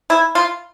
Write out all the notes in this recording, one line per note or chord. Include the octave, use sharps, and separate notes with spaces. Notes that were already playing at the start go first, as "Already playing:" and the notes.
E4
F4